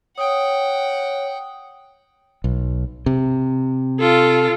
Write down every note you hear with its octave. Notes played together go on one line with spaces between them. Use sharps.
C#5 F#5 G5 D#6
B1
C3
F4 A4